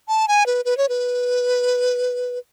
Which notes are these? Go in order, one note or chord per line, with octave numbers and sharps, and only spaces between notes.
A5
G#5
B4
B4
C#5
B4